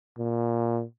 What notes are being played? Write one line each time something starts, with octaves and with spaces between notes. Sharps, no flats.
A#2